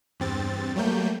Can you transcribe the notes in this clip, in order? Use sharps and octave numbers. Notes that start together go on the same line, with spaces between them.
E2 G2 C4 A6
F#3 G3 A3 A#3 G6